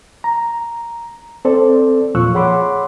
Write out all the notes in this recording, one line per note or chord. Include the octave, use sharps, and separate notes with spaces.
A#5
C4 A4 C5 D5
E2 A#2 F3 C#6 E6 F#6
G#4 C#5 F#5 B5 C6 D6